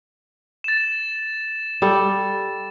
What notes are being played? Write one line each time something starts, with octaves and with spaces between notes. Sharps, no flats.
A6 E7
G3 A4